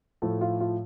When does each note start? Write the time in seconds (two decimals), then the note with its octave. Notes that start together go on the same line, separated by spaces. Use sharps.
0.22 A2 F3 A3 A4
0.41 F4
0.60 F4